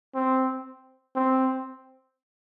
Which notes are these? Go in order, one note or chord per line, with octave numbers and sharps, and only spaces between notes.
C4
C4